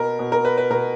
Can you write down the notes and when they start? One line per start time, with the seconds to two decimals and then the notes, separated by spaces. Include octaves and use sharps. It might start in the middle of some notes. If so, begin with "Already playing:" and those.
Already playing: B2 A#4
0.19 B2
0.32 A#4
0.45 B4
0.58 B4
0.70 B2 A#4